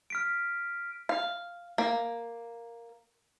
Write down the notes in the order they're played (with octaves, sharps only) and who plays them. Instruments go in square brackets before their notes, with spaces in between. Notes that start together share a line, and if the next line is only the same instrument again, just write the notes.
[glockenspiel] F6 B6 D7
[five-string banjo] F5
A#3